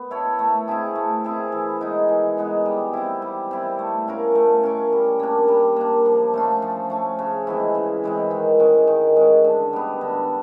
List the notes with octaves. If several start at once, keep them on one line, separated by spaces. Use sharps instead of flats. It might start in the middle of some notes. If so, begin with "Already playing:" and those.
Already playing: B3
E4 A4 C#5
A3
C4 E4 G#4
A3
C4 E4 G#4
E3
G#3 B3 D#4
E3
G#3 B3 D#4
G3
C4 E4
G3
C4 E4
A3
C#4 F4 A#4
A3
C#4 F4 A#4
G3
A#3 D4
G3
A#3 D4
F3
A3 C#4 F4
F3
A3 C#4 F4
C#3
E3 G#3 C4
C#3
E3 G#3 C4
D#3
G#3 C#4
D#3
G#3 C#4
D3
G3 B3
D3